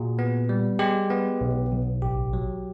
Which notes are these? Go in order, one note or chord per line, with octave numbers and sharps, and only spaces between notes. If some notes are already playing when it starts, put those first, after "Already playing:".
Already playing: A#2 F#4 G#4
B3
G3
G#3 G4
B3
B1
B1
A1 G4
F#3